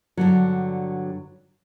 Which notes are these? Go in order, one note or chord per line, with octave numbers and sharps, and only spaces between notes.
G2 D3 F#3